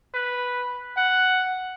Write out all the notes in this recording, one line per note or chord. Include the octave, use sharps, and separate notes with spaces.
B4
F#5